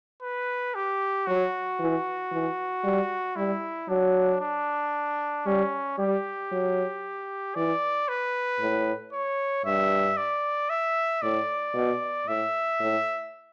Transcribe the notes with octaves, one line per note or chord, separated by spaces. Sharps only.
B4
G4
F#3 F#4
E3
E3
G3
G3 E4
F#3 D4
D4
G3 C#4
G3 G4
F#3
E3 D5
B4
A2
C#5
G2 E5
D5
E5
A2 D5
B2
A2 E5
A2